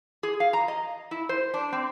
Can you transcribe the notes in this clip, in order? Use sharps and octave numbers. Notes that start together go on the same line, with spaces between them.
G#4
F5
A#5
D#5
E4
C5
D4
C4